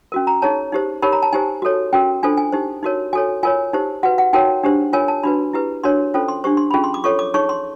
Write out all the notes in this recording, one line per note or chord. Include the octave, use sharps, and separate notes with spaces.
C#4 F#4 A#4
A#5
D#4 G#4 C#5 A5
D#4 G4 C5
D#4 G4 A#4 C#5 B5
A#5
A5
D#4 G4 C5 G#5
F#4 A4 C#5
C#4 F#4 A#4 G5
D4 F4 A4 C5 G#5
G#5
D#4 G4 C5
D#4 F#4 A#4 C#5
F#4 A4 C#5 G#5
F4 A#4 C#5 G#5
D#4 G4 C5
F#4 B4 F#5
F#5
D#4 F#4 A#4 C#5 G5
D4 G4 C5
F4 A#4 C#5 G#5
A5
D4 F#4 B4 B5
E4 G4 B4
D4 F#4 A#4 C#5 C6
C#4 F4 A4 C5
C6
D4 G4 C5 C#6
C6
C#4 F4 G#4 B5
C6
D6
F4 A4 C#5 C#6
D6
D#4 G#4 C#5 C#6
C6